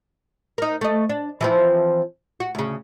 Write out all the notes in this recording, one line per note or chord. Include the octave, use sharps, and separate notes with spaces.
D#4 A#4
A3 D#5
D4
E3 F3 C4
F#4
D2 C#3